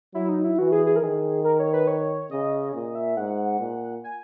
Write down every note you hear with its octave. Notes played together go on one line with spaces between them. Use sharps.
F#3 E4
D#4
E4
E3 F#4
G#4
G#4
A#4
D#3 G#4
A#4
C#5
B4
C#5
C#3 D#5
C#5
A#2 D#5
E5
G#2 F#5
A#2
G#5